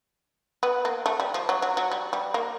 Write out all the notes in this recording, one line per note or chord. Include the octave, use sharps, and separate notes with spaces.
B3
A#3
A3
G3
F3
F#3
F#3
F#3
G3
G3
A#3